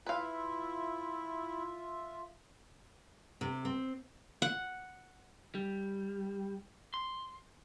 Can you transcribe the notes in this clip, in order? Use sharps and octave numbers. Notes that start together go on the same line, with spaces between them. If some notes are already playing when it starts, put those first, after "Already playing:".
E4 F4 B4 E5 F5
C3
C4
F#5
G3
C6